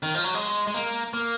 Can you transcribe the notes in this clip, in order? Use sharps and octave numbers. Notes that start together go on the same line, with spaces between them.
D#3
F3
F#3
G#3
G#3
A#3
A#3